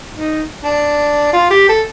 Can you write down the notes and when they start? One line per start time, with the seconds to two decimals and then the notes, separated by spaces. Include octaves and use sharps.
0.17 D#4
0.64 D4
1.33 F4
1.51 G4
1.69 A4